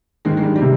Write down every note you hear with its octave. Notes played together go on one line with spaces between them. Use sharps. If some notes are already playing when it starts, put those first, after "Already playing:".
G#2 D#3 G#3
G#3
G2 G3
G3
C3